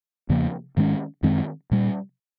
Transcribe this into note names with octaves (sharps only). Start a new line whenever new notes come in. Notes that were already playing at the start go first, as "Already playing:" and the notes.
E2 C#3 F3 A#3
G#2 D#3 G#3 C#4
F#2 D#3 G#3 C4
A#2 G3